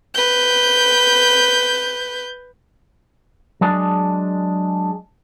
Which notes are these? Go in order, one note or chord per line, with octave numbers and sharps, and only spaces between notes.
B4 G6
F#3 G#3 D4 G#4 A5